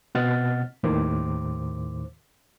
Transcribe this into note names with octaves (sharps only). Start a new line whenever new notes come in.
B2 C4 D#5 F#5 F6 A6
D#2 A2 D#3 C5 D6